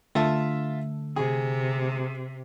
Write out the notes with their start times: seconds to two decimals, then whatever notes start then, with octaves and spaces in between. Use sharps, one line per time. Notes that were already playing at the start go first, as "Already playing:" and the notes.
0.15 D3 A3 F4 E5 A5
1.16 C3 G#4